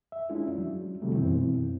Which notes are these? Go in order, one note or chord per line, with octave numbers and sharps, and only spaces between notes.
E5
G#3 C#4 D4 E4 F4
F#3
C3 D#3 F#3 G3 A3
F#2 B2 E3 C4 E4